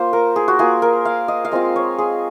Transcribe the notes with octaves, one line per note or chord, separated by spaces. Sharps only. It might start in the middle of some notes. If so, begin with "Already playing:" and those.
Already playing: A#3 F4 C5
A#4
G#4
F#4
A#3 F4 G#4
A#4
F5
D#5
F5
G#3 C4 F4 D#5
C#5
G#4